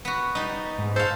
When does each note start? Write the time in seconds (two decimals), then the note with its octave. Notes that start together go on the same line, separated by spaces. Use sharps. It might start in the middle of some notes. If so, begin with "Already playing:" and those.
0.05 B3 F#4
0.35 G3 D#4
0.78 G#2
0.96 A4 C5 F5